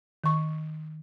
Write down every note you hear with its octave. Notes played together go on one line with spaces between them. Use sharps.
D#3 C#6